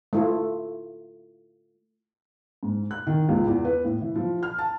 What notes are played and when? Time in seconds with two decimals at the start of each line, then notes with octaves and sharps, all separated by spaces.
0.13 A3 E4 F4
2.63 G#2
2.91 F#6
3.07 D#3
3.29 C#2
3.47 E2
3.65 B4
3.84 A2
4.01 E3
4.16 F3
4.43 F6
4.59 A5